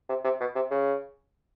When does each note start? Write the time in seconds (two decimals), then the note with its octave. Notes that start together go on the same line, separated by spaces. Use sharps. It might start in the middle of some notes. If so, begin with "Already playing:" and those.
0.09 C3
0.24 C3
0.40 B2
0.55 C3
0.71 C#3